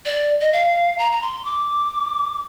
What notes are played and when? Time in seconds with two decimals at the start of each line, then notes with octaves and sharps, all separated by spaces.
0.06 D5
0.41 D#5
0.53 F5
0.98 A#5
1.12 A#5
1.22 C6
1.45 D6